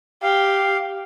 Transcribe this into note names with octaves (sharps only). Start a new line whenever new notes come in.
G4 F5